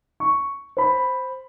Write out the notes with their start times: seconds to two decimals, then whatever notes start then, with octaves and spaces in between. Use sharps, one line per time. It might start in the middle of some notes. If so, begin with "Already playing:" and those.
0.20 C#6
0.77 C5 B5